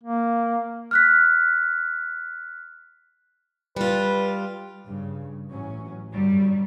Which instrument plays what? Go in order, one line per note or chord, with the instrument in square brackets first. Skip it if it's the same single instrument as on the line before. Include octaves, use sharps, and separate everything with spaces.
[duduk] A#3
[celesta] F6 F#6 B6
[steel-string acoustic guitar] G3 F4 [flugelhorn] B4
[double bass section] G2 C#3
A1 F#3 C#4
[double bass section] G1 F#2 F#3 [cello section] G3